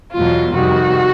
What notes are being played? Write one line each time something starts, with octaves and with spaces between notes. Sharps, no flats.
E2 B2 F#3 F4
F2 C3 D#3 G3 F#4